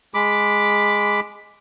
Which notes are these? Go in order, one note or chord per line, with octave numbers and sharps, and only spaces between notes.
G#3 B5 D6